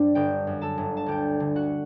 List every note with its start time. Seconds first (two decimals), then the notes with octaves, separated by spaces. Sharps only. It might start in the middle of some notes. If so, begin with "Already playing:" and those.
Already playing: G2 G3 D4 C5 D5
0.15 G1 G4 G5
0.47 F#2
0.62 A4 A5
0.78 G1
0.97 A5
1.06 D2 G4 G5
1.40 D3
1.56 F#4 F#5